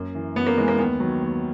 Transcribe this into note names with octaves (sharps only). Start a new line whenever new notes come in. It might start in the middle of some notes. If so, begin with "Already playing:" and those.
Already playing: F#2 A#3
E3
F#2 B3
A#3
E3 G#3
A#3
D#2 B3
D#3 F#3
D#2